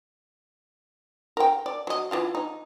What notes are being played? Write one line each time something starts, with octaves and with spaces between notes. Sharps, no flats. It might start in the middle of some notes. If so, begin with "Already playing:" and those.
A#4 G5
D5
F#3 D#5
E3 F4 F5
D#4